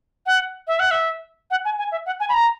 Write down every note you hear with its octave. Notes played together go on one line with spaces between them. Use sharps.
F#5
E5
F#5
E5
F#5
G#5
G#5
E5
F#5
G#5
B5
A#5